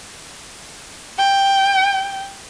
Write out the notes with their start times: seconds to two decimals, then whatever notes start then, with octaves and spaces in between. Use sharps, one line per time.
1.18 G5